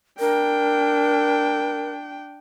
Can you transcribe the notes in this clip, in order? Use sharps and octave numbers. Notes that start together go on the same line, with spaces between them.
D4 A#4 G5